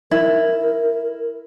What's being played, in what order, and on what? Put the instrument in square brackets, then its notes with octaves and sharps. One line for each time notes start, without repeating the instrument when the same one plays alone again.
[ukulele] E4 [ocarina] A#4